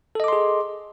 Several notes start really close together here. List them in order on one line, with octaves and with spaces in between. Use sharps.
A4 D#5 D6 C6 G#4